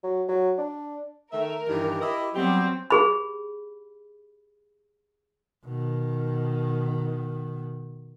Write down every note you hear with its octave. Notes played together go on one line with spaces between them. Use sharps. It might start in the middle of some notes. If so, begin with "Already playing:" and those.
F#3
F#3
D4
D#3 A3 A#4 E5
G2 D#3 E3 G4
E4 D#5
F#3 G3 B3 C4 G4
G4 G#4 B5
B2 D#3